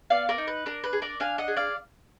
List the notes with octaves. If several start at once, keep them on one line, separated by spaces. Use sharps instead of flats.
B3 D5 F5
A#4 D5
D#4
B4
D4 A#4
B4
G#4
A#4 D5
D4 F5 G#5
D#5 F#5
G#4
D5 F5